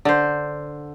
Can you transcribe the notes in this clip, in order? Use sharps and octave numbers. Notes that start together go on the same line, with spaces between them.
D3 C5